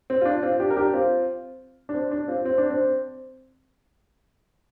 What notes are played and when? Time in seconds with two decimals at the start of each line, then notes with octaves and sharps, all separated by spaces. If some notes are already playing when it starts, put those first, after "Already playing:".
0.10 C4
0.21 F4
0.25 D4
0.43 C4 F4
0.60 D4 G4
0.70 A#4
0.77 D4 G4
0.93 C4 F4
1.89 D4
1.94 C4
2.11 D4
2.28 C4 F4
2.45 C4
2.58 D4
2.70 C4